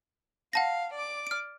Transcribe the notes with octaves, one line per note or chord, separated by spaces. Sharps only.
F5 F#5 A5 A#6
D5 D6
F6 D7